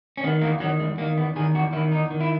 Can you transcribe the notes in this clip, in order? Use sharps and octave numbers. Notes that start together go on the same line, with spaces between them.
C#4
D#3 B3
E2 A#3
D#3 F#3
E2 G#3
D#3 A#3
E2 B3
D#3 G#4
E2 F#4
D#3 E4
E2 D#4
D#3
E4